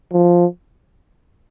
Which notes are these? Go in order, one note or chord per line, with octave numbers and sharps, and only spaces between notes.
F3